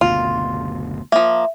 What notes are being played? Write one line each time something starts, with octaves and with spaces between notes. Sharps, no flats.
F#1 D2 B2 F4
F3 A#3 E5